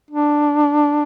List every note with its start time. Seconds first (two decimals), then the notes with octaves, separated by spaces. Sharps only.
0.11 D4